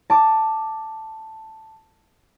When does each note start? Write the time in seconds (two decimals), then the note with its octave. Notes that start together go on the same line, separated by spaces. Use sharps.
0.10 A5 D6